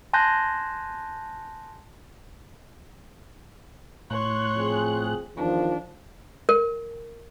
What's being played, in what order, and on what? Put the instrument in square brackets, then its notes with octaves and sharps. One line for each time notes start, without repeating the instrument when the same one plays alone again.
[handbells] G#5 A5 C6 F#6 G6 A#6
[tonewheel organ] A2 F#6 [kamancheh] C#5 C6
[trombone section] F3 C4 G#4
[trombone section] E2 D#3 F3 [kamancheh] D4
[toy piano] A#4